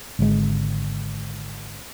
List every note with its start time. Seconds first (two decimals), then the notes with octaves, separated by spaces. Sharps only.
0.19 G#1 D3 G#3